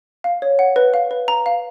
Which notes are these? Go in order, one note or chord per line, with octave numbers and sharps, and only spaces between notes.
F5
C#5
F#5
B4
F5
B4
A#5
F5